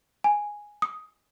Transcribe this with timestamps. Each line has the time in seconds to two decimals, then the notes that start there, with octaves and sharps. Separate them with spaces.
0.24 G#5
0.82 D#6